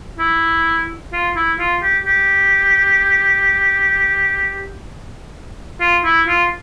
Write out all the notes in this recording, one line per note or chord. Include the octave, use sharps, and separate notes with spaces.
E4
F4
E4
F4
G4
G4
F4
E4
F4